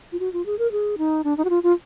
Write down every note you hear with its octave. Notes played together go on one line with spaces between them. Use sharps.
F4
F#4
F4
G#4
A#4
G#4
D#4
D4
D#4
F#4
F4
F4